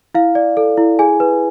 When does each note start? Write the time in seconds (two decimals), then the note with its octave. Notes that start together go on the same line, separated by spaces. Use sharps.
0.14 E4 F5
0.35 D5
0.57 A4
0.77 E4
0.99 G#4 G#5
1.20 B4